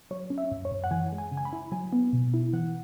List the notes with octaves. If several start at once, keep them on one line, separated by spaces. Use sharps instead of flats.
F#3 C#5
C#4
E5
F#2
C#5
F#2
F#5
E3 G#5
G#3
G#5
C#3
G#5
B5
E4
F#3 G#5
B3
B2
E4
E3 F#5